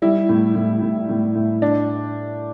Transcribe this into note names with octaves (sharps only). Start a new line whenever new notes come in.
G3 E4
A2
A2
A2
A2
A2
D4